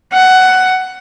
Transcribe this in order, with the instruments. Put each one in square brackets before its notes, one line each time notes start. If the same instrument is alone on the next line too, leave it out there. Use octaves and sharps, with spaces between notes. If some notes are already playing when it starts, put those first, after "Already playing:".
[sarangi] F#5